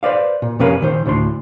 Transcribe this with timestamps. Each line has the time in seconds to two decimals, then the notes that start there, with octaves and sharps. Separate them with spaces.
0.03 B4 C5 D5 F5
0.42 A#2
0.59 F2 C3 C#4 A#4 B4 F5
0.81 A#2 D#3 C5
1.06 D2 A2 D4 C6